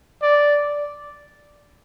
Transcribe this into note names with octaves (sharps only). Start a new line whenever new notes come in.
D5